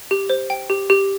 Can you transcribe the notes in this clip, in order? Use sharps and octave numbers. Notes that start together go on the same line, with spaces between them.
G4
C5
G5
G4
G4